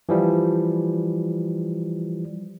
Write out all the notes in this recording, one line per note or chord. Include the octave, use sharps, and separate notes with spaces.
E3 F3 G3